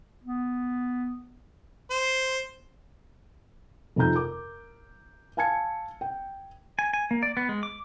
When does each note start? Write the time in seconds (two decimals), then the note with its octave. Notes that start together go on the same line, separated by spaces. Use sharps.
0.24 B3
1.90 C5
3.96 F2 C3 D#3 A#5 G6
4.14 A#4 D6
5.37 F5 G#5 A5 G#6 C#7
6.01 G5
6.79 G#5
6.93 G#5
7.11 A#3
7.23 D5
7.37 B3
7.49 G#3
7.63 D6